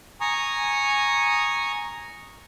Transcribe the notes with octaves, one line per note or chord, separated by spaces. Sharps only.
G#5 A#5 C#6 D#6